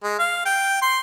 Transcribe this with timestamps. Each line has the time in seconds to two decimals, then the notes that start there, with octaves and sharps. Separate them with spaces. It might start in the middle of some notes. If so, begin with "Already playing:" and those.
0.03 G#3
0.19 F5
0.45 G5
0.82 C6